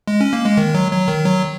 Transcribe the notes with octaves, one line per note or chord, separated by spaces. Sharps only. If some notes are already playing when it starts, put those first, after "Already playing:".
G#3
C#4
A#3
G#3
D#3
F#3
F#3
D#3
F#3